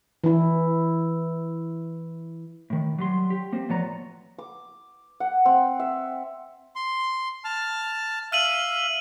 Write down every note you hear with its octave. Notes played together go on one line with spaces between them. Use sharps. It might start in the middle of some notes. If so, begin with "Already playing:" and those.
E3 E4
A2 D#3
F#3 G3 C6
G4
A#3 C4 C5
A2 F3 B3 C#5 D5 A#5
D6
F#5
C4
E5
C6
A5 F6
E5 F5 F6 D#7 F#7